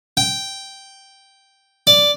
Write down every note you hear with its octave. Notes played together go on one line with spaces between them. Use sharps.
G5
D5